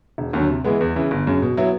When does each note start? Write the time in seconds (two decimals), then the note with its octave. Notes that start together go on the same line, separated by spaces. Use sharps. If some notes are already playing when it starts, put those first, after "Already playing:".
0.18 E1
0.33 D#2 D3 F#3
0.50 C3
0.64 E3 G#3 B3
0.81 E2
0.96 C#3 E3
1.11 G1
1.27 F#2 C#3
1.42 B2
1.57 F#3 B3 E4